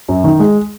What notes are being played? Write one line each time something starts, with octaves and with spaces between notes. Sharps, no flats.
F#2
D#3
G#3